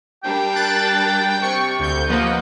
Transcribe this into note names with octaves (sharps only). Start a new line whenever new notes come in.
G3 D4 A#4 G5
F#6 A6
C3 C#6
D2 G6
F3 A#3 B4 D#5 F#5